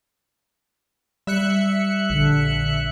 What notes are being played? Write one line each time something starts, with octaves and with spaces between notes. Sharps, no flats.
G3 E5 F#6 C#7
A#1 D3